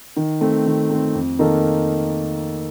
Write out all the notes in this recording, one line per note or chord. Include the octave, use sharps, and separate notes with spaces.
D#3
A3 C4
D#3
A3 C4
F2
D#3 A#3 D#4 A4